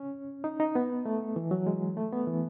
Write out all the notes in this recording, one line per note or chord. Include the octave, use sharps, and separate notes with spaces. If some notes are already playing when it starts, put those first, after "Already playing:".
Already playing: C#4
D#4
D#4
B3
A3
E3
F#3
G#3
A3
B3
E3